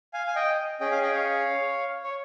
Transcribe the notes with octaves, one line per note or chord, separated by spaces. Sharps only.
F5 G#5
G#5
D#5 G5
C#4 G#4 D#5 G5
F5 G#5
D#5 G5
C#5 F5
C#5